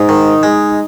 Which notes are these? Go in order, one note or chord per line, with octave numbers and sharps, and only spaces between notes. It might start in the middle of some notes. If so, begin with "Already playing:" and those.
Already playing: G#2 D#4
D#3
G#3